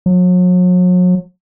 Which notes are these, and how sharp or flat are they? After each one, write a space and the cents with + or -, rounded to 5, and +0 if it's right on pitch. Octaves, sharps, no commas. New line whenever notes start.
F#3 -40